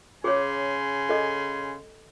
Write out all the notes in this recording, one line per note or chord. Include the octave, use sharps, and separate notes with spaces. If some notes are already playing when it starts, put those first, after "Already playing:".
C#3 G#4 C#5 G#5 C6
A4 D#5